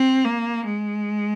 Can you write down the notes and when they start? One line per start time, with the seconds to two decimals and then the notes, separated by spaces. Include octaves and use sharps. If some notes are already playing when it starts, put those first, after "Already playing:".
Already playing: C4
0.25 A#3
0.66 G#3